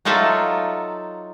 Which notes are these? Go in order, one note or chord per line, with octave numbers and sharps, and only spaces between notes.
F#3 D#4 F4 A4 E5 F5